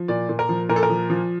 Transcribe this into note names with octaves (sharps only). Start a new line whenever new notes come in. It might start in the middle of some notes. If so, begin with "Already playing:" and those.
Already playing: F3
A#2 D5
A#2
A#4
F3
A#2 A#4
A4
A#4
F3
F3